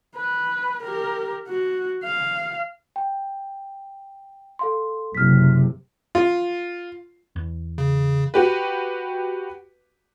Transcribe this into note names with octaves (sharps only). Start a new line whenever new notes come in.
B4
G4 A#4
F#4
F5
G5
A4 F5 C6
F#1 C3 F6 B6
F4
E2
C#3
F#4 G4 B4